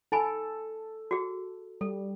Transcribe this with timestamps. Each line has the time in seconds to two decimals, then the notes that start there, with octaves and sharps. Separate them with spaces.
0.12 D#4 A4 G#5 B5
1.11 F#4 G#4
1.81 G3 A4